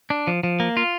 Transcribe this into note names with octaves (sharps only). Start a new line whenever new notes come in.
D4
F3
F3
A#3
F4